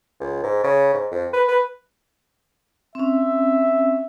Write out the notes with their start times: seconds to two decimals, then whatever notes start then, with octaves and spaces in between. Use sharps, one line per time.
0.20 C#2
0.43 G#2
0.64 C#3
0.94 G#2
1.12 F2
1.33 B4
1.48 B4
2.95 C4 C#4 E5